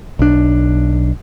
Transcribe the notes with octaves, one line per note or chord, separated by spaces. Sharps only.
B1 D4